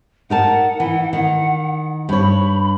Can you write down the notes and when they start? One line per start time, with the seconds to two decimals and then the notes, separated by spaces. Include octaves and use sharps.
0.30 D#4 A#4 F#5 A5
0.80 E3
1.13 D#3 F#5
2.09 G2 C#5 B5